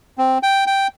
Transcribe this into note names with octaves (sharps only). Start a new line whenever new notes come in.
C4
G5
G5